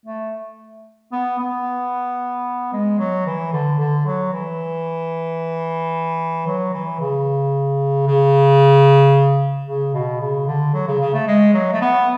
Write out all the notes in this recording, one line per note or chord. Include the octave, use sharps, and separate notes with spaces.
A3
B3
B3
G#3
F#3
E3
D3
D3
F#3
E3
F#3
E3
C#3
C#3
C#3
B2
C#3
D3
F#3
C#3
C#3
A3
G#3
F#3
A3
B3